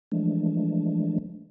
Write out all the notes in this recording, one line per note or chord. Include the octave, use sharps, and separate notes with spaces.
E3 F3 G#3 A3 D4